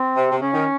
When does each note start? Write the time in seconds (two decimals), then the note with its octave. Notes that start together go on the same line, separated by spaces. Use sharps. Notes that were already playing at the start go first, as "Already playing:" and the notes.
Already playing: C4
0.16 C3
0.31 C3
0.41 C#3 C#4
0.54 D#3